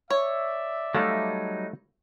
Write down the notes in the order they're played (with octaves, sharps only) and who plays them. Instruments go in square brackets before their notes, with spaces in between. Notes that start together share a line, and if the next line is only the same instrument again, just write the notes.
[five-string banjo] C#5 [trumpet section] D5 E5
[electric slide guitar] F#3 G3 D#4 [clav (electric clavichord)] A3 F5 A5